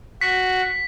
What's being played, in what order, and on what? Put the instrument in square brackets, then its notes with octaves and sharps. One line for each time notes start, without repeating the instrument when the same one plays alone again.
[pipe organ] F#4 [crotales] B6